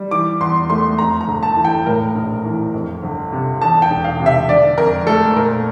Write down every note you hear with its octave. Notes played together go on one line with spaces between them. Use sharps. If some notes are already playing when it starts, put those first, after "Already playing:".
Already playing: G3
E3 D6
E2 C6
A3 C6
F2 A#5
A#5
G1
A5
E3
G5
A2 A#4
A#1
E3
F2
G1
C3
E2 A5
G5
E1
F5
C3
E5
D3 D5
F2 A#4
A3 A4
A#2 A#4